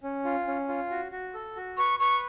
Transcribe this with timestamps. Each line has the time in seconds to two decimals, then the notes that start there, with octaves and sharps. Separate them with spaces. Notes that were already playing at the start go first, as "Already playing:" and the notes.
0.03 C#4
0.25 F4
0.47 C#4
0.69 F4
0.91 F#4
1.12 F#4
1.34 A4
1.56 F#4
1.78 B4 C#6
2.00 B4 C#6